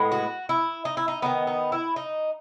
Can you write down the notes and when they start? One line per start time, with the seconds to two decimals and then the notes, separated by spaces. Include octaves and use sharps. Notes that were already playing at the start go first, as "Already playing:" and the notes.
Already playing: A2 G#3 B3
0.12 F#4
0.49 E4
0.85 D#4
0.97 E4
1.08 D#4
1.22 D#3 F#3 B3 D#4
1.47 D#4
1.72 E4
1.96 D#4